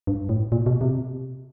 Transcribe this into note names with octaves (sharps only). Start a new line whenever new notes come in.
G2
A2
A#2
B2
C3